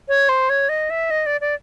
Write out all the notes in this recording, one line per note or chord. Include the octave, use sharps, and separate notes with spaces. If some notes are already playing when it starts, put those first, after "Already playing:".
C#5
C5
C#5
D#5
E5
D#5
D5
D5